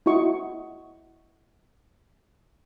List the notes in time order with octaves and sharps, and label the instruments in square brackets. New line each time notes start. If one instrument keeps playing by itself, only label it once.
[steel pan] E4 F#4 D#5 C#6